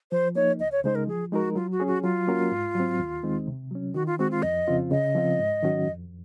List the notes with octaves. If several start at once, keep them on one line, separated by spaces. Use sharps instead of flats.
F3 C5
A#3 D#4 C#5
C#2 D#5
C#5
C#3 G#3 D#4 C5
A#4
F3 G#4
G#3 D#4 F#4 A#4
F#3 F4
F#4
C#4 G#4
F#4
F#3 F4
A#3 C#4 F#4 A#4
G#2
F#3 C4
D#2
D#3 G#3 C4 D#4
C3
F#3 C#4
D#3 F#4
F4
G#3 C4 F#4
F4
F2 D#5
C#3 F3 C4 F4
C#3 D#5
F3 C4 F4
G#2
D#3 F#3 C#4 F#4
F2